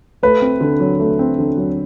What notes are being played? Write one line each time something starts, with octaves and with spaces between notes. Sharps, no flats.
A3 B4
C4
D3
F#3
A3
C4
D3
F#3